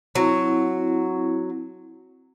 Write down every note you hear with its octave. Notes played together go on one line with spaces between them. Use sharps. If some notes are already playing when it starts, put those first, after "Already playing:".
F#3 C4 E4